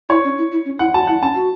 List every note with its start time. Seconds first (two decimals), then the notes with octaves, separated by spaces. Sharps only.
0.09 E4 C#5
0.24 C#4
0.38 E4
0.52 E4
0.65 C#4
0.79 E4 F#5
0.94 F#4 A5
1.07 E4 F#5
1.22 C#4 A5
1.35 F#4